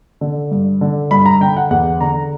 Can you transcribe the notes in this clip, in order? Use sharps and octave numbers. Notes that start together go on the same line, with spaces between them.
D3
G2
D3
G2 B5
A#5
D3 G5
F#5
E2 F#5
D3 A#5